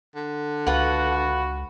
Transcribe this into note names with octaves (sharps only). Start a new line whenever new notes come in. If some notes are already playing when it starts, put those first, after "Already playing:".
D3
C#2 F4 F#4 B4 F#5